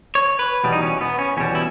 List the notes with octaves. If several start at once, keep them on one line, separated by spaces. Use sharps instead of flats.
C#5
B4
E2 B2 G3
D#4
C#4
B3
C#4
E2 B2 G3 C#4
E4